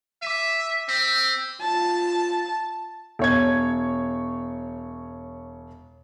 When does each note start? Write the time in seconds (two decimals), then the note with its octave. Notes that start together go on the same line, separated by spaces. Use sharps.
0.22 E5 D6 B6 D#7
0.89 C4 E6 B6
1.61 F4 A5
3.19 E1 C#5 G#6